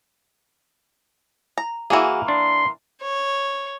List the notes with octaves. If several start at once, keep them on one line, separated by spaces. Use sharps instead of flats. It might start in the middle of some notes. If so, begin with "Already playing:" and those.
A#5
E3 A#3 F#4 G#4
D4 C6
C#5